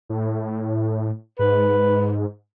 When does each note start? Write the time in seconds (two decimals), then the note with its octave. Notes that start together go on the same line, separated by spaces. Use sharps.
0.09 A2
1.39 G#2 B4